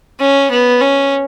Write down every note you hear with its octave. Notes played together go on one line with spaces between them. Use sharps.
C#4
B3
C#4